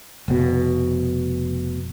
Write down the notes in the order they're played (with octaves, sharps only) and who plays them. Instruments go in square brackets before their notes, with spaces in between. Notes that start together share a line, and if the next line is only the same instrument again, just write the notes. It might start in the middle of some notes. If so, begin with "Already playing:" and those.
[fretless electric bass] F1 B2